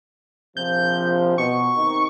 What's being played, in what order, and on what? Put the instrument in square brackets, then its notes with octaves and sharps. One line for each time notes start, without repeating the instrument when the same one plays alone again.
[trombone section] A#1 C3 F3 [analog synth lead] G6
[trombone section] B2 [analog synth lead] C#6
[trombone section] C3 D#3 D#4